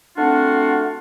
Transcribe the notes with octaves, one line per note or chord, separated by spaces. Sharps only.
A3 C4 D4 F4 F#4 F#5